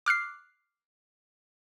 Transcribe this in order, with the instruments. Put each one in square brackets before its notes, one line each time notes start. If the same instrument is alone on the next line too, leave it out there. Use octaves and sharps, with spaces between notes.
[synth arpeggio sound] D6 F6 F#6 C7